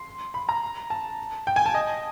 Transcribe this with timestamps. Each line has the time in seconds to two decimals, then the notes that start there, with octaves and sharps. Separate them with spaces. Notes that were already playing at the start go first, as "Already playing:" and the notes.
Already playing: C6
0.34 B5
0.49 A#5
0.90 A5
1.47 G5
1.56 G#5
1.66 A5
1.74 D#5